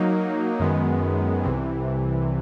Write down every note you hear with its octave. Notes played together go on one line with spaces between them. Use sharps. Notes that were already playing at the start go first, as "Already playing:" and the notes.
Already playing: F#3 A#3 D#4
F#2 D#3 G#3 B3
C2 C3 E3